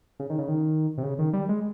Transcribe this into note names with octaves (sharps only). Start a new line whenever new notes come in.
C#3
D#3
C#3
D#3
C3
C#3
D#3
G3
G#3